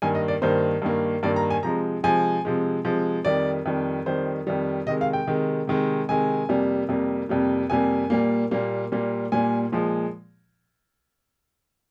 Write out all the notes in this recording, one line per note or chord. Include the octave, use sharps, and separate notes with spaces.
G2 D#3 A#3 G#5
D#5
D5
G2 D#3 A#3 C5
G2 D#3 A#3
G2 D#3 A#3 D5
A#5
G#5
C3 F3 G#3 A#5
C3 F3 G#3 G#5
C3 F3 G#3
C3 F3 G#3
F2 D#3 G3 D5
F2 D#3 G3
F2 D#3 G3 C5
F2 D#3 G3
C3 D#3 G#3 D#5
F5
G5
C3 D#3 G#3
C3 D#3 G#3
C3 D#3 G#3 G#5
F2 C3 G3 A#3
F2 C3 G3 A#3
F2 C3 G3 A#3
F2 C3 G3 A#3 G#5
A#2 G3 A#3
A#2 G3 A#3
A#2 G3 A#3
A#2 G3 A#3 G#5
A#2 F3 G#3